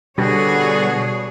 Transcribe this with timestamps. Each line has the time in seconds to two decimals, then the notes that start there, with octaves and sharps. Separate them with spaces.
0.18 B2 D3 G3 B3 F#4 G#4 C#5